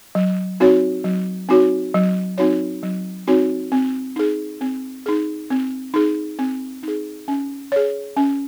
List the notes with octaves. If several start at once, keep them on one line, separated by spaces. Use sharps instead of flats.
F#3
C4 D#4 F#4 C#5
F#3
C4 D#4 F#4 C#5
F#3
C4 D#4 F#4 C#5
F#3
C4 D#4 F#4 C#5
C4
D#4 G#4
C4
D#4 G#4
C4
D#4 G#4
C4
D#4 G#4
C#4
G#4 C#5
C#4